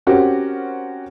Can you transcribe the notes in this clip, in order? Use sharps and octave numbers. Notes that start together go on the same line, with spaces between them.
C4 C#4 F#4 G4 A#4